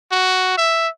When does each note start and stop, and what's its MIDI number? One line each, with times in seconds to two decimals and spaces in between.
0.12 0.54 66
0.58 0.88 76